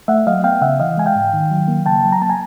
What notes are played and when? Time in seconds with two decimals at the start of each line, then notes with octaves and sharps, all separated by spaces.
0.08 A3 E5 F#5
0.27 F#3 D#5 F5
0.44 B3 F5 G5
0.61 C#3 E5 F#5
0.79 E3 D#5 F5
0.97 G#3 G#5
1.06 F5 G5
1.16 G#2
1.33 D#3
1.51 F#3
1.68 A#3
1.86 C#3 G5 A5
2.05 F#3
2.12 A#5
2.21 A#3 A5
2.29 G#5 A#5